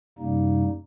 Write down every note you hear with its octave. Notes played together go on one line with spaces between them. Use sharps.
F#2 C3 G3 A#3 D#4